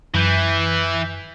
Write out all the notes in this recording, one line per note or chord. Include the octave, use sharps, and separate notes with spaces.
F#2 E3 G6